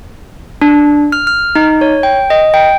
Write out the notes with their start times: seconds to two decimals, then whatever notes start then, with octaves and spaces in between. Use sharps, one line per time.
0.62 D4
1.12 F6
1.27 F6
1.55 D#4
1.81 C#5
2.03 G5
2.30 D#5
2.54 G5